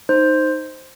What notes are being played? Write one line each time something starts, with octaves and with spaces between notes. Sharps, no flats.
D#4 C5